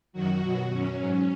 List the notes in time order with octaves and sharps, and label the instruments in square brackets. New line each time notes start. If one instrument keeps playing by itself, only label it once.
[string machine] F#2 D#3 F#3 F#4
B2 F#3
F#2 F#3 C#4
G#2 F#3